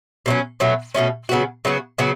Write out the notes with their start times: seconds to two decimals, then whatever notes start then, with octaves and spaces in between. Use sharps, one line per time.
0.26 B2 F#3 A3 C#4
0.60 B2 F#3 A3 C#4
0.95 B2 F#3 A3 C#4
1.29 C#3 F#3 B3 F#4
1.65 C#3 F#3 B3 F#4
1.98 C#3 F#3 B3 F#4